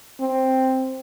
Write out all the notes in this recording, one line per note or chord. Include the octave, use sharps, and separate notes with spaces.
C4